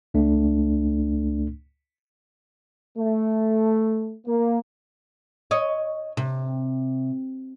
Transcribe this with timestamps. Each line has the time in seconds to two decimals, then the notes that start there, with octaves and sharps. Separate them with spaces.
0.14 C#2 A3 D4
2.97 A3
4.26 A#3
5.51 C#5 D#5
6.17 C3